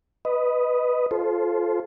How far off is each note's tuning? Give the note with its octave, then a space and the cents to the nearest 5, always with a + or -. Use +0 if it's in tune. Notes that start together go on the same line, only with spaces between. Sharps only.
B4 +0 D#5 +0
F4 +0 A4 -25 C5 +0